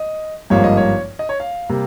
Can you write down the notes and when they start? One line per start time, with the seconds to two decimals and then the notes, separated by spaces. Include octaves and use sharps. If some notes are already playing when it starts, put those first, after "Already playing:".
Already playing: D#5
0.50 G#1 G2 F3 A#3 C#5
0.64 D#5
0.77 C#5
1.19 D#5
1.29 C#5
1.40 F5
1.69 C3 G3 A#3